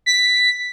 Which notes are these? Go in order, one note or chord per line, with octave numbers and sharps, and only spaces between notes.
B6